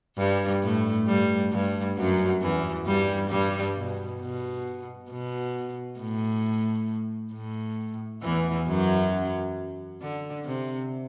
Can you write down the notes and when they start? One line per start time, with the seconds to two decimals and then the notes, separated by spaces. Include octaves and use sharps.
0.17 G2 G3
0.62 A2 A3
1.07 G2 G3
1.51 G2 G3
1.97 F#2 F#3
2.41 E2 E3
2.86 G2 G3
3.30 G2 G3
3.76 B2
4.21 B2
5.10 B2
6.00 A2
7.33 A2
8.22 E2 E3
8.68 F#2 F#3
10.02 D3
10.45 C3